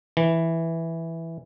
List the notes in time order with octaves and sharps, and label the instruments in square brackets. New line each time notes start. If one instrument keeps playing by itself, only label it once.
[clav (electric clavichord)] E3